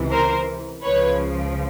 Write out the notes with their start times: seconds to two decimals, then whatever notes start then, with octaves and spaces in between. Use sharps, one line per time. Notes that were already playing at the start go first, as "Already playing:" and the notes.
Already playing: C#2 C3 E3
0.11 A#4 C5
0.83 C#2 C#3 F3 B4 C#5